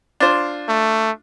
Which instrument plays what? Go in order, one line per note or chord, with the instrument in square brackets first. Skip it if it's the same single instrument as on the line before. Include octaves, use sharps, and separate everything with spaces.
[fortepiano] D4 F4 C5
[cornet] A3